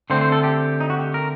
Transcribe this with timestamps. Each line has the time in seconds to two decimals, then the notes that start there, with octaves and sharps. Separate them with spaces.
0.10 D3 A3 C4 C5
0.21 C5
0.32 A4
0.44 G4
0.80 D#4
0.90 F#4
0.99 G4
1.14 A#4